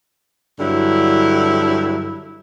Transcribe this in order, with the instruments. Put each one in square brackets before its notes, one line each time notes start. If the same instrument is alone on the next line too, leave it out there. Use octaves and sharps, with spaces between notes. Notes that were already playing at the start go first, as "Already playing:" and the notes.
[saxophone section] G2 D3 F#3 E4